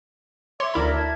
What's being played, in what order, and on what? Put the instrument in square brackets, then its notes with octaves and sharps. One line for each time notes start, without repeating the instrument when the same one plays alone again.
[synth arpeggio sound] C#5 C6 [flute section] E5 D6
[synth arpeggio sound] D2 E4 B5 [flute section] A#4 D5 E5
[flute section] E5 A5 G#6